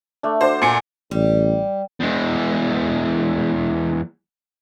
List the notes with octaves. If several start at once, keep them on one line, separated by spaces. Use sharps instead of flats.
A3 D4
D4 F#4 C5
A#2 G#5 C#7
A1 G3
E2 G#3